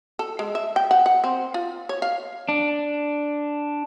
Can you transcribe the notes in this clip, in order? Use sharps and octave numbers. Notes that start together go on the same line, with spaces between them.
A4
G#3
E5
G5
F#5
F#5
C4
F4
C#5
F5
D4